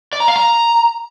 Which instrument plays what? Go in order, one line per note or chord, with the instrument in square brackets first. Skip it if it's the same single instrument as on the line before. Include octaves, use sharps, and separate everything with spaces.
[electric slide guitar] D5
A#5
F5
A#5